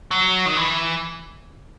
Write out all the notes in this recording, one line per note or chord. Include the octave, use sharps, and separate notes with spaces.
F#3
D#3
E3